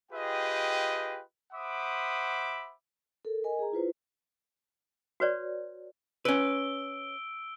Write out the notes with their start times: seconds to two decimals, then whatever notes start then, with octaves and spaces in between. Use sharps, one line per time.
0.11 F4 G4 G#4 B4 D#5 G5
1.53 C5 E5 F#5 B5 D6 D#6
3.25 A4 A#4
3.44 A#4 D#5 G#5
3.59 G#4 A#5
3.72 E4 F4 B4 C5
5.20 F#4 B4 C#5 D5
6.25 C#4 B4 E6 D7 G7